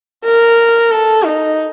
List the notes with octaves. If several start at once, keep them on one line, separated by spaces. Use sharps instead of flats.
A#4
A4
D#4